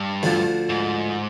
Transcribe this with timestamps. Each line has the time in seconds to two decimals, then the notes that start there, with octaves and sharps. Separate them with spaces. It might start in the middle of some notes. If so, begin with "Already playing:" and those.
Already playing: G2
0.23 D2 D3 F3
0.69 G#2